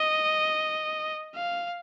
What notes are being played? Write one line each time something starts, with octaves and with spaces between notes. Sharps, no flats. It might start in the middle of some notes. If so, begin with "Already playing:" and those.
Already playing: D#5
F5